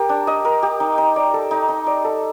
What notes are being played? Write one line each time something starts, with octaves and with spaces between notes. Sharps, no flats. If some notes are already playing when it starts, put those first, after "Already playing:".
Already playing: G4 A#4
D4
D#5
A#4
G4
D#4
D#4
D5
A4
D#4
D#4
D5
A4